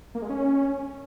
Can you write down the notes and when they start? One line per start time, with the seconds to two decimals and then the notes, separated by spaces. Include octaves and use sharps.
0.15 A#3
0.22 G#3
0.29 C#4